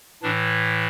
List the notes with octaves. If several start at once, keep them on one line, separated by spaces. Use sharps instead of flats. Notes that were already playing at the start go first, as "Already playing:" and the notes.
A2 E3 D4